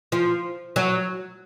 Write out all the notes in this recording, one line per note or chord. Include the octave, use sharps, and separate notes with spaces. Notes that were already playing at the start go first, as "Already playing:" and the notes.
F3
F#3